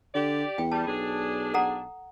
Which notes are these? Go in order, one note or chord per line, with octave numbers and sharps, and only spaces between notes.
D3 G4 D5
E2 G5
G3 A5
B1 D4 G#4
A4 F#5 A#5